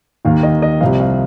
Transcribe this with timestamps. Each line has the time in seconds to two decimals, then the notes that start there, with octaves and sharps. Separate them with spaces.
0.25 D#2 D#3 F5
0.43 D#5
0.62 D#5
0.81 C2 C3 F3 F5
1.00 F5